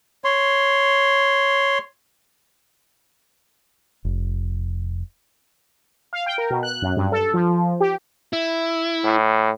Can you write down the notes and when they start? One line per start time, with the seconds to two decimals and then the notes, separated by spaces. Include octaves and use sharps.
0.24 C#5 C6
4.05 F1
6.13 F5
6.26 G5
6.38 A#4
6.50 B2
6.63 F#6
6.82 F#2
6.96 G2
7.12 A4
7.34 F3
7.80 G4
8.33 E4
9.04 A2